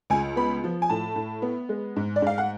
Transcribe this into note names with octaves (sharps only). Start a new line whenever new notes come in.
C#2 G#5
B3 B5
F3
G#5
A2 A5
A2
B3
G#3
G#2
D5
G#2 F5
F#5